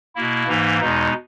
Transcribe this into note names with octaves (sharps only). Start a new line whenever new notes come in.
B2 A#3 E4
G#2 E3 A#3 D#4
E2 B2 G#3 D#4